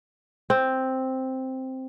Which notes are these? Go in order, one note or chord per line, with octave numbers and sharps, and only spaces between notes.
C4